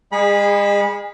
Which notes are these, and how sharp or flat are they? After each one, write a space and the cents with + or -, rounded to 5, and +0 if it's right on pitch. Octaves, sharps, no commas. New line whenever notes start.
G#3 -40 G#4 -20 B5 -25